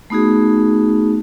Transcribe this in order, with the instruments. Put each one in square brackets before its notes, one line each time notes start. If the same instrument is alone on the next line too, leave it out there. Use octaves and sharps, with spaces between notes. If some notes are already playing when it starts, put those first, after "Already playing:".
[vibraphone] A3 B3 D#4 F#4 G#4